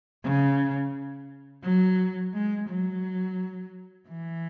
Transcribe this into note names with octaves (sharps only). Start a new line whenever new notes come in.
C#3
F#3
G#3
F#3
E3